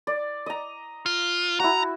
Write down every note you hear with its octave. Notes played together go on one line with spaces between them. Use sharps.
D5
D#5 A#5
F4
E4 F#4 A#5